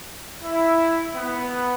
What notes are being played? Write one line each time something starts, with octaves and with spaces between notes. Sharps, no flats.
E4
B3